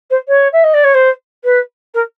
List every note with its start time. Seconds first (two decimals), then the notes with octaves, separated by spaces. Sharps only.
0.10 C5
0.28 C#5
0.52 E5
0.63 D#5
0.74 D5
0.84 C#5
0.94 C5
1.44 B4
1.94 A#4